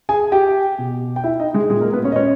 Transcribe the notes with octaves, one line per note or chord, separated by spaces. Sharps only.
G#4 G#5
G4 G5
B2
G5
E4 E5
D#4 D#5
G#3 G#4
A#2 G#3 G#4
A#3 A#4
B3 B4
C#4 C#5
D#5
C#4 C#5